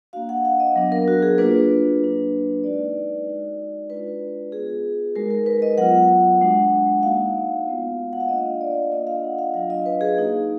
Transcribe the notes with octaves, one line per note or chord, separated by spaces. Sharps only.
A#3 D4 F#4 F5
F#5
F5
D#5
F#3 B3 D4
A#4
F#4
G#4
A#3 D4 F4 B4
F#3 A#3 D4
G#3 D#4 F#4 D5
G#3 D#4 F#4
G#3 D4 F4 B4
B3 F4 G#4
G#3 D#4 F#4 A#4
A#4
B4
D#5
F#3 B3 F4 F#5
G#3 D4 F#4
A#3 D#4 F#4 F5
G#3 B3 F4
F#5
F5
A#3 D4 F4 D#5
D5
A#3 D4 F4 D#5
F5
F#5
F5
F#3 D4 F4 F5
D#5
B4
G#4
A#3 D#4 F#4